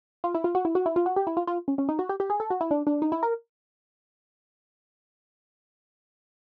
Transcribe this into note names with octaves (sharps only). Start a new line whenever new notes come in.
F4
E4
F4
F#4
E4
F#4
E4
F4
F#4
G4
E4
F4
F4
C#4
C#4
D#4
F#4
G4
G4
G#4
A4
F#4
E4
D4
D4
D#4
E4
A#4